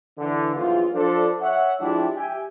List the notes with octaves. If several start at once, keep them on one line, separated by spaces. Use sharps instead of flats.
D3 E3
A#1 E2 G#2 F#3 F4
F3 D4 A4 C5
C#5 E5 F#5
F3 G#3 D4 E4 G4
G4 E5 G5 G#5